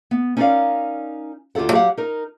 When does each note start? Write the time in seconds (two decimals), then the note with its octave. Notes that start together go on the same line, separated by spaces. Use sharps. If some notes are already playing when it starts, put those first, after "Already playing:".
0.11 B3
0.37 C#4 D#4 A#4 C#5 D5 F5
1.55 D2 F4 G4 A4 F#5
1.71 F#3 G4 F5 F#5
1.97 D#4 A#4